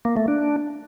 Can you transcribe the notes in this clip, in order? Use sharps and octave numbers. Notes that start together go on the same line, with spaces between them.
A#3
A3
D4